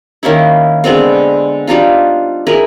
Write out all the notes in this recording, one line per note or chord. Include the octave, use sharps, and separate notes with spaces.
D#3 A#3 C#4 E4
D3 G#3 B3 C4
G3 D4 D#4 F4
E4 G#4 A#4 B4